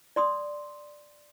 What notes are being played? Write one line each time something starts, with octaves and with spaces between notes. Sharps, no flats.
D5 C6 D#6